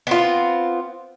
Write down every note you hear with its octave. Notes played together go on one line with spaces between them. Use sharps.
B3 C4 F4